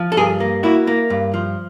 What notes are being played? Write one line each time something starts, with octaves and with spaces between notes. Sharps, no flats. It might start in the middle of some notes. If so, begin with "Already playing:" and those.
Already playing: F3
A4
G2 G#4 A#4
A#3
A#3 E4 F#4
A#3
G2
F3